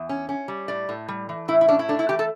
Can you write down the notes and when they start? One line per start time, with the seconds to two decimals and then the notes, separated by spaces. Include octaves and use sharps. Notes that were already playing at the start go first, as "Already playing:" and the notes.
Already playing: E2
0.09 C#4
0.29 C#4
0.48 G3
0.68 A2 D5
0.89 A2
1.08 G3
1.29 E3
1.48 A2 E4
1.61 E4
1.68 C#4 D4
1.79 E4
1.89 A3 D4
1.99 E4
2.09 E3 G4
2.19 A4